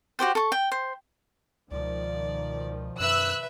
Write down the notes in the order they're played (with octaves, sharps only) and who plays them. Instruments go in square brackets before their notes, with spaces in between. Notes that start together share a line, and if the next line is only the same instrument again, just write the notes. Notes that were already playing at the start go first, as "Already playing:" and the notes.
[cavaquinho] F#4 G4 C5 G5
A4 C#6
G5
C5
[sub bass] C#2 [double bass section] B2 D#3 F3 [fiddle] D5
[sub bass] F#2 [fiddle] B4 E5 [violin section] E6 F#6